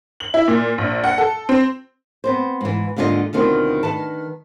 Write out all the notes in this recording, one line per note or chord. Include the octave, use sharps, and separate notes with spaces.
F#7
E4
A#2
A#1
F#5
A4
C4
B3 C4 C5
G#2 E3
D#2 G#2 D3 F4 G#4 D#5
D2 B2 D#3 C4 F4
D#3 B4 A5